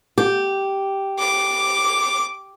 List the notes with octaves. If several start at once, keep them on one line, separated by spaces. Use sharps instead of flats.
G4
D6